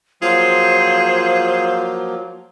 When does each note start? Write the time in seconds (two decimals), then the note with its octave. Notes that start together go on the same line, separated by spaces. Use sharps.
0.22 F3 F#3 A#3 F4 G#4 C5